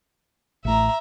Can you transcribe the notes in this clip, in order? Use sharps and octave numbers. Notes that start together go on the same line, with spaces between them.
A1 A2 E5 A#5